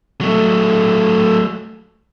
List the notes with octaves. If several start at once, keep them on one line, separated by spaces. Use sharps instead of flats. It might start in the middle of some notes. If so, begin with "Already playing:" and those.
F#3 A3